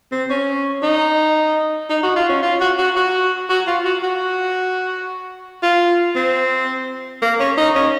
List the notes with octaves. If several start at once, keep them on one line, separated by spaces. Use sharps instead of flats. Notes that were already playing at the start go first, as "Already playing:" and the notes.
C4
C#4
D#4
D#4
F#4
F4
C#4
F4
F#4
F#4
F#4
F#4
F4
F#4
F#4
F4
C4
A#3
C#4
D#4
C#4